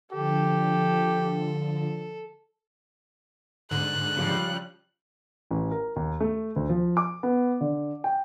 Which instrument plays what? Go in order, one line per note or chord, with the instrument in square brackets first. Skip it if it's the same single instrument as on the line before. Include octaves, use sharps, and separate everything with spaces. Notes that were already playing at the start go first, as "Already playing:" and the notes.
[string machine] D3 F3 [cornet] G4 [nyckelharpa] A4
[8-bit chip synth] G#2 D3 [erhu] F#6
[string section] C#3 F3 G3
[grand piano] A1
A#4
D#2
A3
D2
F3
D6
B3
D3
G5